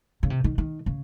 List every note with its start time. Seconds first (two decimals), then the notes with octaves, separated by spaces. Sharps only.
0.23 C#3
0.30 C3
0.44 D#3
0.58 D#3
0.86 C#3